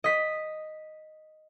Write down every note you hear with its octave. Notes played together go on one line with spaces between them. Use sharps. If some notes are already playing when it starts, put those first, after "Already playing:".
D#5 B6